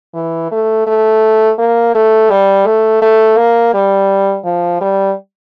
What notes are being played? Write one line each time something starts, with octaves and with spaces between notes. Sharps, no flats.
E3
A3
A3
A#3
A3
G3
A3
A3
A#3
G3
F3
G3